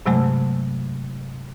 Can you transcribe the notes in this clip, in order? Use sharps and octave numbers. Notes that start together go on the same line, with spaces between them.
G2 C3 F#3 G#3 A3